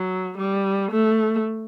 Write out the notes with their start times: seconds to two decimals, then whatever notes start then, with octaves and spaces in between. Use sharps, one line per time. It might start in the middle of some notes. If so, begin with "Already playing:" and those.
Already playing: F#3
0.38 G3
0.91 A3